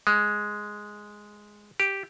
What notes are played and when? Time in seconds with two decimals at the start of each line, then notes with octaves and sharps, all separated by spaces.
0.07 G#3
1.80 G4